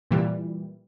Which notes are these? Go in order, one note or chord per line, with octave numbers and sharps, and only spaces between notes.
A#2 E3 G3